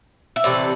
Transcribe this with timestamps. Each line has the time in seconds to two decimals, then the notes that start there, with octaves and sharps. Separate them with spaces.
0.36 E5
0.44 C3 E3 A3 C4 D5